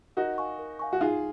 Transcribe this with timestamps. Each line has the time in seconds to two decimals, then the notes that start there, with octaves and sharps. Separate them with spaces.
0.17 D#4 F#4 A#4
0.38 F5 G#5 C#6
0.59 A#4
0.79 F5 G#5 C#6
0.93 F#4
1.01 D#4 F4 G#4